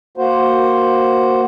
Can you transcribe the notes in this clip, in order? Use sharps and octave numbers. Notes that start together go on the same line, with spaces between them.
A#3 F#4 C5